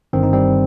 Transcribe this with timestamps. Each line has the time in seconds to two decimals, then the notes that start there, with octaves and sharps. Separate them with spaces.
0.13 G1 G2 D#3 C4
0.23 D#4
0.33 G3 C4